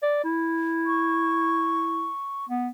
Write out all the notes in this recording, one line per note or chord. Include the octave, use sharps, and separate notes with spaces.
D5
E4
C#6
B3